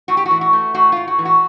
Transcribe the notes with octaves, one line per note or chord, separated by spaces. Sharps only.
A2 F#4
G4
F#4
E3
F#4
A3
A2 F#4
A2 F4
F#4
E3
F#4